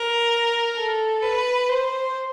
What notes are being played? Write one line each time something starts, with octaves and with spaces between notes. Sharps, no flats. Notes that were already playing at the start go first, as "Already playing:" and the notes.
Already playing: A#4
A4
B4
C5